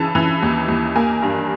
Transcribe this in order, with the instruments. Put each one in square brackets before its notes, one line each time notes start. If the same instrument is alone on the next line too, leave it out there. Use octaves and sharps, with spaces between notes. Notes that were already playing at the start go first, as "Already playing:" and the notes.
Already playing: [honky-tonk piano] C#3 E3 A5
E3
D#2
D#2
A#3 G#5
G2